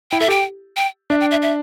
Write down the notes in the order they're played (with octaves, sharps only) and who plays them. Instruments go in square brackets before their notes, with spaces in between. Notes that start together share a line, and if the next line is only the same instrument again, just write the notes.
[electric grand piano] E4 [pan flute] G5
[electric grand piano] A4 [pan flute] E5
[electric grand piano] G4 [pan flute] G5
[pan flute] G5
[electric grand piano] D4 [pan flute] E5
[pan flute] G5
E5
E5